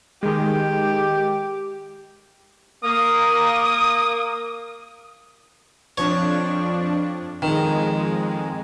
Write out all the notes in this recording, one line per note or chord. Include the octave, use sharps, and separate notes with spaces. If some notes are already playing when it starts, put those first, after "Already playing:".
D#3 G#3 G4
A#3 D#6
F2 F3 D4 C#5
F2 D#3 G#3